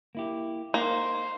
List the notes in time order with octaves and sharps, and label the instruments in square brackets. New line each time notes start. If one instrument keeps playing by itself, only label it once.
[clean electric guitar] A#3 E4 G4
[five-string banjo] A#3 [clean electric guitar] D#4 [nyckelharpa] C5